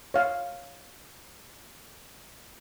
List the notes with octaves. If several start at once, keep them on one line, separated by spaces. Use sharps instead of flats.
C#5 F5